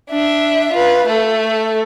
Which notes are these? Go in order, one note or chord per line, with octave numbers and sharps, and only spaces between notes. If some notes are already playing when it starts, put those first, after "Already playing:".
D4 E5
F4 B4
A3 A4